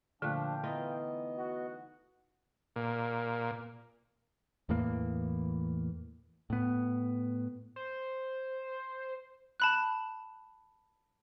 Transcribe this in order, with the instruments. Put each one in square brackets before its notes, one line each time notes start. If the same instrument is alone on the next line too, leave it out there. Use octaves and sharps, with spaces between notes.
[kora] A#2 A3 [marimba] D3 F#6 [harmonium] F3 D4 [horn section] F5 G5
[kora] E3 D#4 F4 [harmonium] B3 D#5
[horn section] F#4
[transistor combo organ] A#2
[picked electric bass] E2 A2 E3 A#3
A2 B3
[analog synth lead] C5
[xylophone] A5 B5 F#6